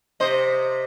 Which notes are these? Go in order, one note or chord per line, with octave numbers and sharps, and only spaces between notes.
C3 C5 D#5